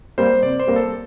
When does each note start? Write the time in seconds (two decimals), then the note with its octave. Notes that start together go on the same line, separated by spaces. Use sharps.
0.18 G3 A#3 C5
0.43 C3 D5
0.60 C5
0.67 G3 A#3
0.76 A4